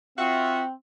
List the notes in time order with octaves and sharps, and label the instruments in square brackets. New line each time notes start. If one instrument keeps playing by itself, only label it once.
[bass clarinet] C4 [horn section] F4 F#4 E5